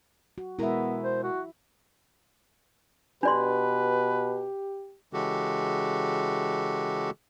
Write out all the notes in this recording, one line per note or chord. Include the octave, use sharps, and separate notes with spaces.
F#4
B2 G#3 B3 E4 A#4 E5
C5
F#4
B2 D4 G4 B4 D5 C6
C#3 E3 G#3 F#4 G4 A4